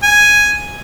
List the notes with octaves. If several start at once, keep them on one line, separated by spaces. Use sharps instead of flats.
G#5